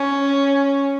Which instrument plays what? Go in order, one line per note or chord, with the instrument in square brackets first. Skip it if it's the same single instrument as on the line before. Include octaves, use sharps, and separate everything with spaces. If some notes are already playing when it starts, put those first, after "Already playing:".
Already playing: [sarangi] C#4